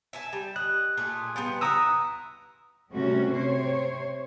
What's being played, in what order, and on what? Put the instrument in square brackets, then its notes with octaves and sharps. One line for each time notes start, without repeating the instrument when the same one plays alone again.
[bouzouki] E5 G#5 A5
G3
[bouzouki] D#5 [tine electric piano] F#6
[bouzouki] A#2 A3 G#4
F3 G3 B3
[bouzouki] E4 F#5 [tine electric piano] A#5 D#6 E6
[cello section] C3 G3 A3 C#4 F#4
C3 C5 C#5